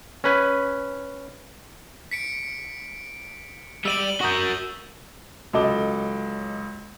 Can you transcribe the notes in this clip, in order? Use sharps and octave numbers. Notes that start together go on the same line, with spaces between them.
C#4 B4 G#5
B6 C#7 D7
G3 D5 E6 D#7 F#7
F#4 A#4 C#6 D#6 G6
C#2 F#3 A4 D#5 D6 G7